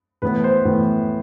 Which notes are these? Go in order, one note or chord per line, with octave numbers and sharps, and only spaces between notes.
A2 E3 B3 B4
C5
A2 E3 B3